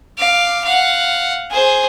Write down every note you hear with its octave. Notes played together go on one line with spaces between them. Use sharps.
F5 D6
F5 F#5
G#4 C5